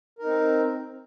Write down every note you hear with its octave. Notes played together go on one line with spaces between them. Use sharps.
C4 D#4 A#4